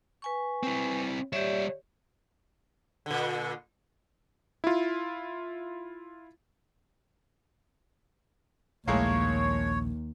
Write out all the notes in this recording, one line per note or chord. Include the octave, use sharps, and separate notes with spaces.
B4 G#5 C#6
C4 E4
G3 G4 C#5 D5 E5
A#2 D3
E4 F4
A#1 D#2 A2 G#3 A#3 C#5